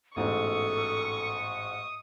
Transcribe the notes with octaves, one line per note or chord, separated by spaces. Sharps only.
A1 G#2 B2 A4 C#6 D#6